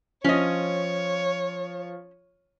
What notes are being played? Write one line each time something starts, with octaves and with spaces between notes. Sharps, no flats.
F3 C#4 F4 C#5 D#5